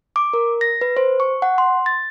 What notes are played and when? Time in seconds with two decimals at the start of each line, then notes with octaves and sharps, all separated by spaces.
0.16 D6
0.33 A#4
0.61 A#6
0.81 B4
0.97 C5
1.20 C#6
1.42 F#5
1.58 C6
1.86 A6